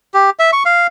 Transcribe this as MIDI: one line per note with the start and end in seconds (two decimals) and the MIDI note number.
0.14 0.30 67
0.39 0.51 76
0.53 0.63 85
0.65 0.87 77